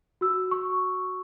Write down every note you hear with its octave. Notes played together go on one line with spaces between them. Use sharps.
F#4 E6
C#6